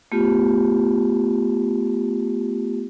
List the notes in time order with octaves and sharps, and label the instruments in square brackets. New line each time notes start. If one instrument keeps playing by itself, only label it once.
[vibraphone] A3 B3 F4 G4